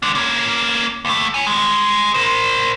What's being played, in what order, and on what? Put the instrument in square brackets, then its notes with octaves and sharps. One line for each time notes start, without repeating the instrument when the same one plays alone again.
[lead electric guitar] G#3 D4
A#3 C#4
D#2 A3
A3 G#5
G3 G#3
A#4 C5